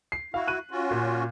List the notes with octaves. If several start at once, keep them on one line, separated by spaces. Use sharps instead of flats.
C7
E4 F#4 F5
F#6 D#7
C#4 F4 F#4
A#2